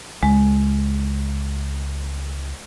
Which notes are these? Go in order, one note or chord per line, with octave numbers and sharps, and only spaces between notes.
C#2 G#3